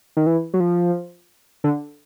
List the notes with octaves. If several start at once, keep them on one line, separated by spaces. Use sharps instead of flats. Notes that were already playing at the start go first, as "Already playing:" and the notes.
D#3
E3
F#3
F3
D3